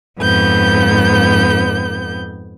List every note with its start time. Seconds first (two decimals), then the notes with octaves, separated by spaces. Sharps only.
0.20 F2 G#2 B3 G6